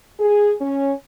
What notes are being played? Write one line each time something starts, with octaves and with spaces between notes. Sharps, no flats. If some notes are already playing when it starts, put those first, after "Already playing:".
G#4
C#4